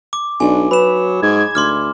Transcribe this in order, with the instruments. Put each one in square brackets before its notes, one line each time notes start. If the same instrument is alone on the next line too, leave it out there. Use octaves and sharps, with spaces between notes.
[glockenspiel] D6
[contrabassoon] B1 [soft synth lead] D4 [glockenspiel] G#5
[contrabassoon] F#3 [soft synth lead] B4 [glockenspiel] B5 E7
[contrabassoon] G#2 [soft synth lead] G#6
[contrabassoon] D2 [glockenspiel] C6 D6 F6